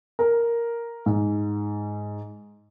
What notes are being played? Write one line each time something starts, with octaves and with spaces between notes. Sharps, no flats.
A#4
G#2